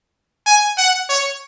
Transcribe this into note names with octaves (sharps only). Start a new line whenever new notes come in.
G#5
F#5
C#5